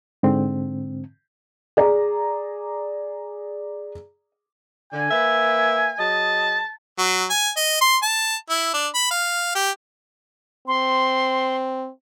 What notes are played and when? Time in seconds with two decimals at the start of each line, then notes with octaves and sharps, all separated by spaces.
0.23 G#2 D3 C4
1.77 G#4 D5 A#5
4.93 D3 G#5
5.11 A#3 B4 E5
5.99 F#3 G#4 D#5 A5
6.99 F#3
7.30 G#5
7.57 D#5
7.81 C6
8.03 A5
8.50 E4
8.74 D4
8.95 B5
9.11 F5
9.55 G4
10.68 C4 C6